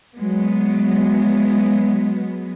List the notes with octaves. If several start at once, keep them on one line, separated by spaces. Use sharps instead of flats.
F#3 G#3 B3